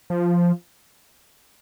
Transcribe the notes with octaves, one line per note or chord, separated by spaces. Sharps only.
F3